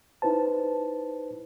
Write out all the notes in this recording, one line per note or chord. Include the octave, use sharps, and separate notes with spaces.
D#4 E4 B4 C5 A5